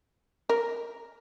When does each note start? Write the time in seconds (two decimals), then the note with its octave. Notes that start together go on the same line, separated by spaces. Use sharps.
0.50 A#4